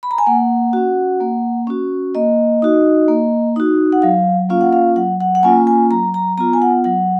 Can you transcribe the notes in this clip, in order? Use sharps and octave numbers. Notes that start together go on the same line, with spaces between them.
B5
A#5
G#5
A#3 F#5
C#4 F#4
A#3
C#4 F#4
A#3 D#5
D#4 F#4
A#3
D#4 F#4
F#5
F#3 F5
A#3 C#4 F4 F5
F#5
F5
F#3 F#5
F#5
F#5
A#3 C#4 F4 G#5
G#5
F#3 A#5
A#5
B3 F4 A#5
G#5
F#5
F#3 F#5